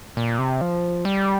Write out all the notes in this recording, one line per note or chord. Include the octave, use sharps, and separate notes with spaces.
A#2
C3
F3
G3